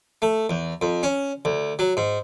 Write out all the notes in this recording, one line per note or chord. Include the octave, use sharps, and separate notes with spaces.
A3
E2
F2
C#4
D2
F#3
G#2